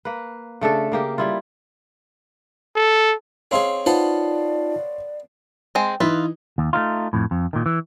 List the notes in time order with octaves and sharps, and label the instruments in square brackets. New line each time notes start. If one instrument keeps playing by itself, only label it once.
[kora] A#3 B4
C#3 A3 D4 A4
C#3 A#3 G4
G3 E4 F4
[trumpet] A4
[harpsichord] C4 D#4 G#4 [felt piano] C#5 F5 C6
[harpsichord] B3 C5 F#5 [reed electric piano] D#4 F4 A5 [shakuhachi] D5
[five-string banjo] G#3 C4
[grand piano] E3 D#4 [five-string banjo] F4 B4 E5
[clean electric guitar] D#2
A3 A#3 D#4 F4
F2 A2
F2
A#2 D#3
E3